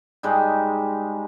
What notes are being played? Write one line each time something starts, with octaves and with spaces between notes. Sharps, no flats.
G#2 G3 G#3 D#4